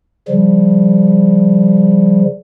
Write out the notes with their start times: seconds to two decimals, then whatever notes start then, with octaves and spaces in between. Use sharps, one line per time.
0.28 C#3 F3 G3